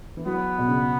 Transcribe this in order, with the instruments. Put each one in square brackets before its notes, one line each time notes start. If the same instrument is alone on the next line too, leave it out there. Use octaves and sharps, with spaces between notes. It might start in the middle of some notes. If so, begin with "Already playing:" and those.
[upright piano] E3
[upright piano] F#3 [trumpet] B3
[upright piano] B2
C#3